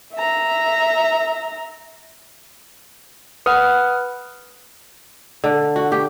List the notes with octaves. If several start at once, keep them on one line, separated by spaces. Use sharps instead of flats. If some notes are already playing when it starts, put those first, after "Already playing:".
E5 A#5
B4 F#5 D#6 F6
D3
F#4
G4